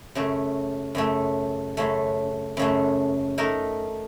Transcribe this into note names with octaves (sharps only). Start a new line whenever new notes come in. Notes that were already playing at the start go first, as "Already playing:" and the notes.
F#2 C#3 A3
F#2 C#3 A3
F#2 C#3 A3
F#2 C#3 A3
A3 D#4 A#4